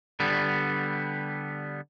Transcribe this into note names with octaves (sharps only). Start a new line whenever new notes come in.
D3 G3 B3